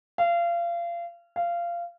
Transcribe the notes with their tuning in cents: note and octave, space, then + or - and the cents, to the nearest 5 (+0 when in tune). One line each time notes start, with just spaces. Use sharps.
F5 -30
F5 -20